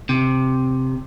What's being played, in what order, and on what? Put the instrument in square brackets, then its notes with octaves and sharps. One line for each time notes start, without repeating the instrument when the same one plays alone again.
[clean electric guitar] C3